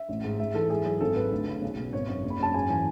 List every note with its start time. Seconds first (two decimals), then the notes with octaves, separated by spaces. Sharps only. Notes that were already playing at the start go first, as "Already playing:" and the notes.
Already playing: E5
0.09 A1
0.24 G#2
0.39 G#2 E5
0.54 E3 A4
0.70 G#2 G#4
0.85 F#3 G#4
1.01 G#1 A4
1.16 G#2 B4
1.31 D2
1.47 C#3
1.62 B1
1.78 B2
1.93 G#1 C#5
2.09 F#2
2.23 F#1
2.30 B5
2.40 F#2 A5
2.54 G#2 G#5
2.70 E3 G#5